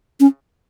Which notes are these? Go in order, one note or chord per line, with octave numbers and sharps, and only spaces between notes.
C#4